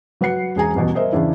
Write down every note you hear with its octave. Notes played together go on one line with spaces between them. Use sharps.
F#3 B4 F#5 C7 C#7
E1 G#4 G#5 A#5
D#1 E2 B2
A#4 C5 D#5 E5
E2 C#3 D4 E4